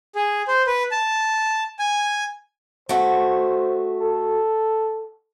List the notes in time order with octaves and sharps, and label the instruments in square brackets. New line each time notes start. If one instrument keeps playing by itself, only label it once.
[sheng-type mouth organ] G#4
C5
B4
A5
G#5
[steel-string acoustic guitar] A3 F#4 [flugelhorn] C5
[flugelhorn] A4